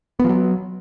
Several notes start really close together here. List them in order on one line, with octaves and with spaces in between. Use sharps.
B3 F3 F#3